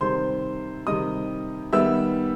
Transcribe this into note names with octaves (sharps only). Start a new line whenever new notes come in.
C3 D#3 G3 C5 C6
C3 D#3 G3 D#5 D#6
D#3 G3 B3 E5 E6